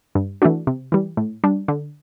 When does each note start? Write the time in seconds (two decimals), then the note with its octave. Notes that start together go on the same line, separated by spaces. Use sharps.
0.15 G2
0.42 E3 A3 D4 F#4
0.67 C3
0.92 E3 G3
1.17 A2
1.44 G3 D4
1.68 D3